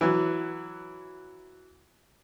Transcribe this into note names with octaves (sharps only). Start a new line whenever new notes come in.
E3 F#3